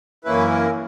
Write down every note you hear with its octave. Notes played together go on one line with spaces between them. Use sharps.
F#2 E3 A#3 C#4 E4 B4
A#4